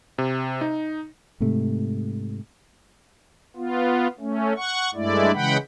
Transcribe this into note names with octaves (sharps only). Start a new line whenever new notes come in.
C3
D#4
G#2 C3 A3
B3 F4
A3 C#4
F#5 C#6
G2 G#3 A3 E4 D5
C#3 E3 G#3 F#5 G5 B5